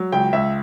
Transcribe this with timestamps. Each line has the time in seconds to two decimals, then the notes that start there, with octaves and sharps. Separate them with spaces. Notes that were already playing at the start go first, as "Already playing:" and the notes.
Already playing: F#3
0.12 C#2 G5
0.33 C#2 E5